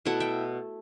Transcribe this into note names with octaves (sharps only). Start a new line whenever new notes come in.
B2 A3 E4 F#5 A5
E5 G5